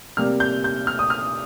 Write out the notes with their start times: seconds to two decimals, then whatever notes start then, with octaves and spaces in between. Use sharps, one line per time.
0.17 C3 G3 A#3 F6
0.40 G6
0.64 G6
0.87 F6
0.99 D#6
1.10 F6